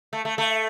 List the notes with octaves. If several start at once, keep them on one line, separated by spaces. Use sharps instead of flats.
A3
A3
A3